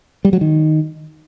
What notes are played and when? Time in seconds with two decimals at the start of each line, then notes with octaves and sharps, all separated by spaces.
0.25 G3
0.33 F#3
0.41 D#3